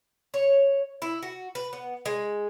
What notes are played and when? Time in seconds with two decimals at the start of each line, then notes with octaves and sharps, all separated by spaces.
0.34 C#5
1.02 E4
1.23 F#4
1.55 B4
1.73 B3
2.06 G#3